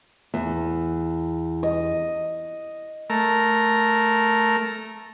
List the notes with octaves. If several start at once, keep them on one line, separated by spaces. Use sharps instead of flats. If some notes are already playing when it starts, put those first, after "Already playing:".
E2
D#5
A3 A#4